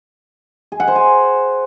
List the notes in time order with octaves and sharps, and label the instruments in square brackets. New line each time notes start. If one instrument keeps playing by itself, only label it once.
[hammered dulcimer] G#4
F#5
C5
G#5